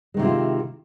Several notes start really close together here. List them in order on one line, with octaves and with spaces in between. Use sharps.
G#3 D#3 C3 E4 F4